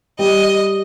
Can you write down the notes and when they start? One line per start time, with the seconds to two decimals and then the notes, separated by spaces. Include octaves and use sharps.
0.19 G3 D#5